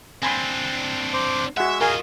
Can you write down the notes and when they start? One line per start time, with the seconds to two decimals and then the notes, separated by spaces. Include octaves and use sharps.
0.23 C4 D4 G#5 B5 C6
1.13 C5 D6
1.57 G#3 F#4 E5 F#5
1.81 F4 G#4 A#4 D#5 F5 G#5